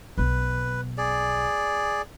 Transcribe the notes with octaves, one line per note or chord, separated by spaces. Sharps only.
B1 B3 B4
G#4 D5